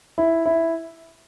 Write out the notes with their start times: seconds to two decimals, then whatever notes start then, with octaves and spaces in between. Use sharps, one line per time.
0.18 E4
0.46 E4